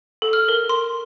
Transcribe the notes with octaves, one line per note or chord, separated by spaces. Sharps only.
A4
F6
A#4
C6